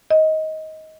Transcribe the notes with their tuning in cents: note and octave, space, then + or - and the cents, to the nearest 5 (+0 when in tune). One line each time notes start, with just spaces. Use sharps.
D#5 +15